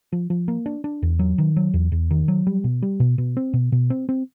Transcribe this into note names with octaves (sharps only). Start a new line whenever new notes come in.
F3
F3
A#3
D4
D4
E2
F#3
D#3
F#3
E2
E2
D#3
F#3
G3
B2
G3
B2
B2
C4
B2
B2
C4
C4